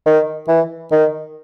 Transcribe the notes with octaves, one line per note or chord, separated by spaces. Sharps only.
D#3
E3
D#3